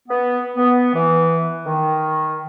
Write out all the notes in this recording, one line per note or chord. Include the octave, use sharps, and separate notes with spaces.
B3
B3
E3
D#3